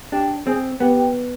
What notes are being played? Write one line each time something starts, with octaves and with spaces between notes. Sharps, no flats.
D4 G4
C4 G#4
B3 G4